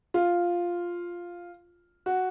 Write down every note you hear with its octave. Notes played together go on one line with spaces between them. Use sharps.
F4
F#4